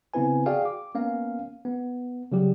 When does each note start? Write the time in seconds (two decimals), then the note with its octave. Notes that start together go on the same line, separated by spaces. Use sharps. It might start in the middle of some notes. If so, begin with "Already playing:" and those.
0.14 C#3 B3 C4 E4 B4 G#5
0.46 F#4 G#4 D5 F5 G5
0.65 D6
0.95 A#3 B3 C#4 F5
1.65 B3
2.32 C#3 F#3 G3 G4